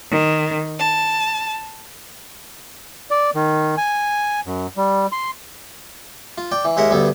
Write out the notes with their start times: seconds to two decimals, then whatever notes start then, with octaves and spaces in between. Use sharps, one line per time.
0.10 D#3
0.79 A5
3.11 D5
3.35 D#3
3.77 G#5
4.46 F#2
4.77 G3
5.12 C6
6.38 F4
6.52 D5 G5
6.65 E3
6.77 D#2 G#3 A#4 E5 F#5
6.91 D2 G2 B3 A4